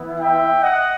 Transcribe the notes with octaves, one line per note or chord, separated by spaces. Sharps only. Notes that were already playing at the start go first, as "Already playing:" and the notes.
Already playing: E3 B3 E4
E5 G5
D#5 F#5